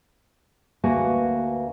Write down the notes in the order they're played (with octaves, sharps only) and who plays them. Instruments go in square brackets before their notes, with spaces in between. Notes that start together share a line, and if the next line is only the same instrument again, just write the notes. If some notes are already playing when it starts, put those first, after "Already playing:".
[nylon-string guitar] D2 A#3 F#4 B4 G#5